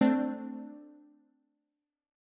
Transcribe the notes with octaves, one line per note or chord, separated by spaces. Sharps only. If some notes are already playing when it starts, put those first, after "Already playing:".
A3 C4 D4